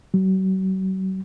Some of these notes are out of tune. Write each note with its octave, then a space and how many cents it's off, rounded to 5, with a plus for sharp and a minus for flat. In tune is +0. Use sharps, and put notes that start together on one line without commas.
F#3 +40